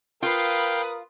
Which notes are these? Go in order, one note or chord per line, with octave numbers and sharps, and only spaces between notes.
F4 A#4 B4 F5 G5 D#6